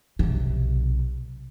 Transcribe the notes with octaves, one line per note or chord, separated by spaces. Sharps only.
B1 C3